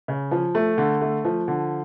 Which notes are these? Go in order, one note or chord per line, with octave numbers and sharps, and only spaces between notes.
C#3
F3
A3
D3
A3
F3
D3